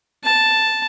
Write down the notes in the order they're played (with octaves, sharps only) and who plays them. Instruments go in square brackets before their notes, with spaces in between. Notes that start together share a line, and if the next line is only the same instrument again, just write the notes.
[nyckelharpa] A5